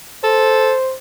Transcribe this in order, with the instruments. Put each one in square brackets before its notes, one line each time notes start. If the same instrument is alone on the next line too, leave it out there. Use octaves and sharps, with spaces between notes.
[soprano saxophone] A4 [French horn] C5